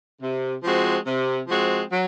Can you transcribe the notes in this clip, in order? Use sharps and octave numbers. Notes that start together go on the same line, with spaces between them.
C3
F3 G#3 C4 F#4
C3
F3 G#3 C4 F#4
F#3